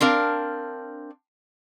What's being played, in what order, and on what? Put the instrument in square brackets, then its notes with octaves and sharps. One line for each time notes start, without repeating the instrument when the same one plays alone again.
[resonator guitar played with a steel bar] C4 D4 A#4 F5